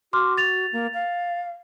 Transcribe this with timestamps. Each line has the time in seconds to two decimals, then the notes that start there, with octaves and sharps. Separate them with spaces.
0.13 F#4 C6 D6 F6
0.37 A6 F7
0.73 A#3
0.94 F5